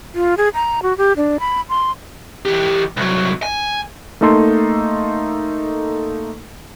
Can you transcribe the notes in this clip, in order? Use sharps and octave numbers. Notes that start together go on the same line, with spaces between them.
F4
G#4
A#5
F#4
G4
D4
B5
C6
E3 G4
C2 F#3
G#5
A3 A#3 D#4 A4 C6